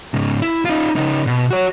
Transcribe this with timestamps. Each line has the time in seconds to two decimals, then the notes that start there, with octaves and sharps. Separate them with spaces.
0.14 G#2 C#3
0.42 E4
0.65 D#4 F4
0.96 C#3 D#4
1.27 B2
1.51 F#4 C#5